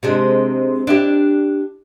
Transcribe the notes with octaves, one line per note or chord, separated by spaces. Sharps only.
C3 G#3 D4
D4 E4 G4